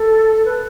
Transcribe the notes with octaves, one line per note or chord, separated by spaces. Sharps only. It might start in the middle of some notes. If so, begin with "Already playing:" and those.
Already playing: A4
B4